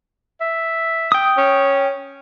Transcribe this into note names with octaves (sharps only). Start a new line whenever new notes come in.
E5
G5 D#6
C#4